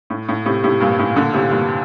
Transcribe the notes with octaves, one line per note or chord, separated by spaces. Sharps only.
A2
A2
A2 C3
A2 C3
G2 A#2
A2
A#2 D3
A2 C3
G2 A#2